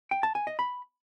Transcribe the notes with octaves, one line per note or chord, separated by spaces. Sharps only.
G5
A5
G#5
D#5
B5